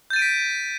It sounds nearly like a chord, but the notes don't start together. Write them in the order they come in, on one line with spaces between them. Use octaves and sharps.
G6 A6 D#7 D7 B6